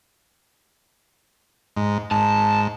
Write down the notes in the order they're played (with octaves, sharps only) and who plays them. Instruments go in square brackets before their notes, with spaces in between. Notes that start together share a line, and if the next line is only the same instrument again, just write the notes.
[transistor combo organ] G#2
[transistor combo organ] G#2 [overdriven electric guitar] A5